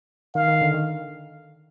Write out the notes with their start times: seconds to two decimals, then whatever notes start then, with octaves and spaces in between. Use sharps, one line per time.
0.35 D#3 F5
0.48 D#3
0.61 D3
0.74 D#3